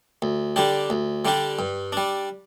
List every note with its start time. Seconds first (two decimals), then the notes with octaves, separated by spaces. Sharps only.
0.22 D2
0.56 D3 G3 D4 G4
0.90 D2
1.25 D3 G3 D4 G4
1.59 G2
1.92 G3 D4